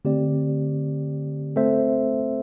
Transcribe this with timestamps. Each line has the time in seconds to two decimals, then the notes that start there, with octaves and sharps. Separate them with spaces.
0.05 D3 A3 C4 G4 D5
1.56 A3 C4 A4 C5 E5